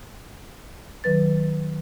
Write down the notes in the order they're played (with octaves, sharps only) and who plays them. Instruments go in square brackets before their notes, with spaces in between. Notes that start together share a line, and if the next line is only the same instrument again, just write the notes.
[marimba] D#3 F#3 B4 A6